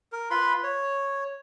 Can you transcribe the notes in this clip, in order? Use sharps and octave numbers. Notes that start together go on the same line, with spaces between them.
A#4
F4 B4 B5 C6
C#5